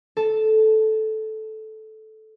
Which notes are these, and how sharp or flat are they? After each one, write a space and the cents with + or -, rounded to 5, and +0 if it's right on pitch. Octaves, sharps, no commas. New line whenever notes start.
A4 -10